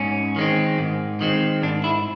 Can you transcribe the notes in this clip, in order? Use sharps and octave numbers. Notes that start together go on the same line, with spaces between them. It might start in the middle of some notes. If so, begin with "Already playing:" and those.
Already playing: G#2 C#4
D#3 G#3 C4
G#2
D#3 G#3 C4
G#2 D4
E4